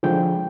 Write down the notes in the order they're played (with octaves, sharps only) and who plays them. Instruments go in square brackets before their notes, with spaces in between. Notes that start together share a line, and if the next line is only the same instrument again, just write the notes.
[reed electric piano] D3 F3 G#3 G5